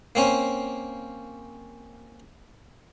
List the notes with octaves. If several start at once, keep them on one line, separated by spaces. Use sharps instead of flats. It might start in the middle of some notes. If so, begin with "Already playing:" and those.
A#3 C4 C#4